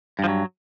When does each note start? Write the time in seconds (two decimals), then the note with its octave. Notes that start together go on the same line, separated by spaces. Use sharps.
0.19 G2
0.24 F3
0.29 F#3